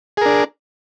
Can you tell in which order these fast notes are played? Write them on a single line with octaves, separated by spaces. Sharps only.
G#4 A#4 D4